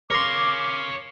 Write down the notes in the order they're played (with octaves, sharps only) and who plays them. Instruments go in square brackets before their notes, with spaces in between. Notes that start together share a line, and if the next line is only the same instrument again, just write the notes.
[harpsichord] A#4 C6 [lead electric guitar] C#5 F5 [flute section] D6